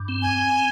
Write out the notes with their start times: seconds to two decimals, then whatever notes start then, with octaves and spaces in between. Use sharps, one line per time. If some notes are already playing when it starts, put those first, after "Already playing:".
Already playing: G2
0.08 C4
0.22 G#5